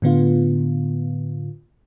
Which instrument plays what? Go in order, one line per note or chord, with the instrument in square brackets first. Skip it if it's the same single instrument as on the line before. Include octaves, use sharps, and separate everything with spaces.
[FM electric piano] A2 D3 B3 F4